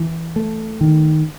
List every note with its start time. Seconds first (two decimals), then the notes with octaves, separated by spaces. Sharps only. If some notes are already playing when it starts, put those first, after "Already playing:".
Already playing: E3
0.36 A3
0.81 D#3